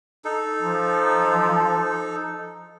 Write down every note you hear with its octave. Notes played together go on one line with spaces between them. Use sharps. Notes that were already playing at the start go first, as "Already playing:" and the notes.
D#4 A4
F3